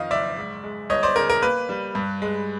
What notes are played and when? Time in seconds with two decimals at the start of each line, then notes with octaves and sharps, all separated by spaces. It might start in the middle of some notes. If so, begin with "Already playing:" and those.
Already playing: F2 D#3 D#5 F5
0.11 F#1 D5 E5
0.37 G#2
0.64 G#3
0.90 G1 C#5 D#5
1.03 C5 D5
1.16 C#3 A#4
1.30 A#4
1.42 A#3 B4
1.69 G3
1.95 G2
2.22 G#3